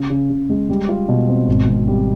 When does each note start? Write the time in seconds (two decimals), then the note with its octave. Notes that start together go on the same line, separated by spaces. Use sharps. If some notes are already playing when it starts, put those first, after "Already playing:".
Already playing: C#3
0.10 C#3
0.30 C#3
0.50 G#3
0.69 G3
0.89 F4
1.09 B2
1.28 C4
1.48 G#1
1.68 G#2
1.87 G3